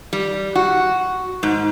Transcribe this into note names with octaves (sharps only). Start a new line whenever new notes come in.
G3
F#4
G#2